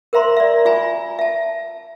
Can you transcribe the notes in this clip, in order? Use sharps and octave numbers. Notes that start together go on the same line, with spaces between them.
A#4 C5 E5 A#5 C6
D5 E5
F4 E5 G#5 A#5
E5 A5